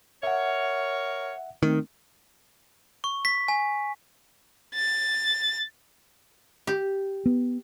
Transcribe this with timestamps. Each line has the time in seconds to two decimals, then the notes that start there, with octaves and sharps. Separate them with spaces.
0.23 A#4 C#5 E5 F#5
1.63 D#3 A3 C4
3.04 C#6
3.25 B6
3.48 G#5
4.75 A6
6.67 G4
7.26 B3